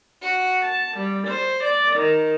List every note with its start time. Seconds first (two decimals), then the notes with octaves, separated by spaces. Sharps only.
0.22 F#4
0.62 A5
0.96 G3
1.26 C5
1.64 D5
1.96 D#3